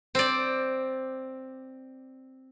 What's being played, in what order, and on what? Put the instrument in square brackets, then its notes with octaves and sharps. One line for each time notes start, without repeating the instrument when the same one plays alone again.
[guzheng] C4 D5